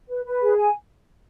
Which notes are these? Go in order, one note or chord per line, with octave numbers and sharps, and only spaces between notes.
B4
B4
G#4
G#5